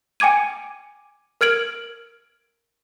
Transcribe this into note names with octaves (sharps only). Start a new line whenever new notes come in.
G5 G#5 D6 G#6 D#7
A#4 F6 G#6 D7 F#7